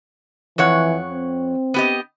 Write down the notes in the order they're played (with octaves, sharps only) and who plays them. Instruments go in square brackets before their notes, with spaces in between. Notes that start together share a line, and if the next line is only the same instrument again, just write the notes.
[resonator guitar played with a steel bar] F2 C#5 F#5 [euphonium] E3
[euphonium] C4
[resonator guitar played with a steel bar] B3 G4 D#5